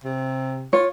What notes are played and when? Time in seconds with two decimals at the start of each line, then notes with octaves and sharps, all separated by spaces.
0.04 C3
0.73 F4 C#5